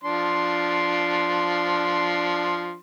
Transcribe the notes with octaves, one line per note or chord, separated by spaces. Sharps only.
F3 D4 C6